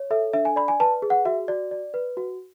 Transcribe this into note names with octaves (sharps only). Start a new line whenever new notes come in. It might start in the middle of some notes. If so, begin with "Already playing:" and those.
Already playing: C#5
A4 E5
D4 E5
G#5
D5 B5
G#5
B4 A5
G#4
F#5
F#4 E5
F#4 D5
D5
B4
F#4